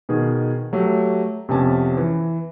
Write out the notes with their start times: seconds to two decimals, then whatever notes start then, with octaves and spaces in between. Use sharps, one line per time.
0.09 B2 D#3 G#4
0.73 F#3 A3 G4
1.48 F2 C3 B3 C#4 G#5 A5
1.97 E3